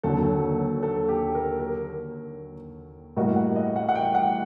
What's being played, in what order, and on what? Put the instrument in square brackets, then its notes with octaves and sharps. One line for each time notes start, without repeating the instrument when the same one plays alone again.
[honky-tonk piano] D#2 D3 F#3 [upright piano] A4
[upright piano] A4
G4
A#4
A#4
[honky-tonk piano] A2 G3 A#3 F#4 [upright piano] D#5
[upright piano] F#5
D#5
F#5
F#5
G5
F#5